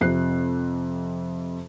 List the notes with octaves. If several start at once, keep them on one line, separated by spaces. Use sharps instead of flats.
F2 C3 F#6 C7